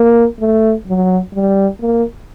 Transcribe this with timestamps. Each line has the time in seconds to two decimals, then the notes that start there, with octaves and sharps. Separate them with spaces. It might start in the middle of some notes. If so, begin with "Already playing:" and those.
Already playing: A#3
0.40 A3
0.87 F#3
1.34 G3
1.81 A#3